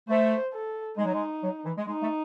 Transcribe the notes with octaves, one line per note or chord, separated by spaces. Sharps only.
A3 C5
A4
G#3 D#4
F#3
G#3
F#3
E3
G#3
G#3 D#4
A3